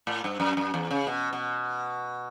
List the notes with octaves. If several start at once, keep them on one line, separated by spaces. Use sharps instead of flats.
A2
G2
F#2
F#2
E2
C#3
B2
B2